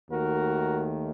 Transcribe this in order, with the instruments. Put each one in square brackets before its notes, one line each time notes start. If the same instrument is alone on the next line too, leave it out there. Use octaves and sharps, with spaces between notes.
[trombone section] D#2 D#3 A3 F#4 A#4